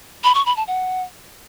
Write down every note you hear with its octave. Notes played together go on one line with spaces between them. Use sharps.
B5
C#6
B5
A5
F#5